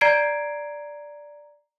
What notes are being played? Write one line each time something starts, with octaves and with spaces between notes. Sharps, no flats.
D5 A#5 G#6 C7 D7